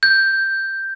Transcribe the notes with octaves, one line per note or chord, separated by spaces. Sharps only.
G6